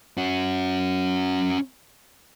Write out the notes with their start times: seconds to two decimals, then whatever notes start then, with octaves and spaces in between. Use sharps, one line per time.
0.18 C#4 F#4